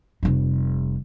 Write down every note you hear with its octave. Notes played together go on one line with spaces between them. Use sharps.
F1 G3